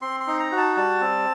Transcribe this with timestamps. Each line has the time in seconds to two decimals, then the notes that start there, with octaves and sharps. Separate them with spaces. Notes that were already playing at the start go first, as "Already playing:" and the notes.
0.02 C4 C6
0.20 C6
0.27 D#4
0.39 A#5
0.52 F#4
0.58 A5
0.76 G3 A5
1.01 C4